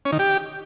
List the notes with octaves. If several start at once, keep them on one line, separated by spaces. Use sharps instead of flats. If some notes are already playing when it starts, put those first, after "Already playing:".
C#4
D#3
G4